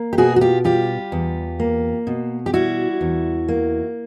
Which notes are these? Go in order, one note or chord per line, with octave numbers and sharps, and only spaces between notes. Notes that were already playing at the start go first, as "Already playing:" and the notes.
Already playing: A#3
G4
B2 F#4 G#4
F#4
F4 G4
G3 F4 G4
E2
A#3
B2
G4
G3 E4 F#4
E2
A#3